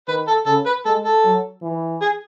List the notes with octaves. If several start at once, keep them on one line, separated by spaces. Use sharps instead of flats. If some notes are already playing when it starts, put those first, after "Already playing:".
D#3 B4
A4
C#3 A4
B4
G#3 A4
A4
F#3
E3
G#4